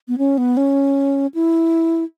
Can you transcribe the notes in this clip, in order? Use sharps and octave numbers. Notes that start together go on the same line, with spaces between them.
B3
C#4
B3
C#4
E4